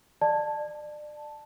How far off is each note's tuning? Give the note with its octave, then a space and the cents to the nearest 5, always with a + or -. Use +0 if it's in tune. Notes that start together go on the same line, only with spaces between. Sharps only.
D5 +30 A5 +0